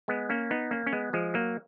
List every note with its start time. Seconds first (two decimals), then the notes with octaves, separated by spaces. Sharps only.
0.08 G#3 B3
0.29 A#3 C#4
0.51 B3 D#4
0.71 A#3 C#4
0.86 C#4
0.93 G#3 B3
1.13 F3 G#3
1.34 F#3 A#3